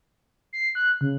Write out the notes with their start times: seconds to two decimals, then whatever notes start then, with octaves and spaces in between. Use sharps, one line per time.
0.53 C7
0.75 F#6
1.01 C#3